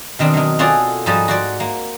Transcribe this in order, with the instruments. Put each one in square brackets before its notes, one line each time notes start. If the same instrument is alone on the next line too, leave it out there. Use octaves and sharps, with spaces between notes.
[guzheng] B2 D#3 C4 D4
D#3 F#3
F4 F#4 G#4 A4 C#5 D5
G#2 F3 G3 F#4 D#5 A5
F#4 C5 D5
A#3